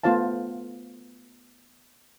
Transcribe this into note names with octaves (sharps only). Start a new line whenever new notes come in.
A3 B3 F4 C5 F5 A5